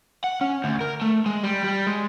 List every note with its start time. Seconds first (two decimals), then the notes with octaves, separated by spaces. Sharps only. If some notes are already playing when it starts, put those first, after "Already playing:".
0.24 F#5
0.41 C#4
0.64 D2
0.81 A#4
1.01 A3
1.26 G#3
1.44 G3
1.64 G3
1.87 G#3